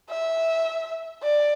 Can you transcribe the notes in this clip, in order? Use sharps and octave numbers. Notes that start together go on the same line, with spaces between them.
E5
D5